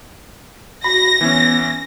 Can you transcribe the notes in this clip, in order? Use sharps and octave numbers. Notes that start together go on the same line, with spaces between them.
F#4 B5 A#6
E3 B3 C#4